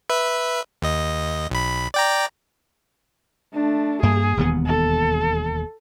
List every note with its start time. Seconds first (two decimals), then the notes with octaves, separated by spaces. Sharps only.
0.10 B4 E5
0.82 D#2 D#5
1.50 B1 B5
1.94 D5 G5 A#5
3.54 A3 D4
4.03 G2 A#3 G#4
4.37 E1 D#2 B3
4.66 A4